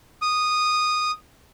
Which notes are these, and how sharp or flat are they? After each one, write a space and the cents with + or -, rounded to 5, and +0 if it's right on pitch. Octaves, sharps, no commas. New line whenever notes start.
D#6 -10